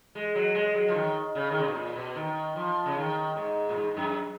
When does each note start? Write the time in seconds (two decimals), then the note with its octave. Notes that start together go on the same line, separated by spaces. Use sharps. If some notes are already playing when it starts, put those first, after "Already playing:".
0.15 G#3
0.35 F#3
0.55 G#3
0.75 F#3
0.88 F3
0.94 D#3
1.35 C#3
1.51 D#3
1.59 C#3
1.67 B2
1.75 A#2
1.96 B2
2.15 D#3
2.56 F3
2.86 C#3
2.97 D#3
3.36 G#2
3.69 A#2
3.76 G#2
3.97 F#2